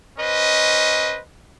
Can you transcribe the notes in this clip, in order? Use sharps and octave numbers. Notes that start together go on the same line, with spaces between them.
C#4 B4 C5 D#5